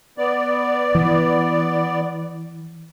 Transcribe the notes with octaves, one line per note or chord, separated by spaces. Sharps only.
B3 D5
E3